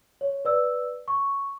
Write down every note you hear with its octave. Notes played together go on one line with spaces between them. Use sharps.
C#5
B4 D5 E6
C#6